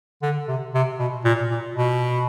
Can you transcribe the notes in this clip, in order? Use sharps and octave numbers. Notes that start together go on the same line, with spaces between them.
D3
C3
C3
B2
A#2
A#2
B2